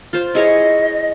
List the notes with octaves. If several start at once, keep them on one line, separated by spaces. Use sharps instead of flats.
F4 C5
E4 G#4 C#5 D#5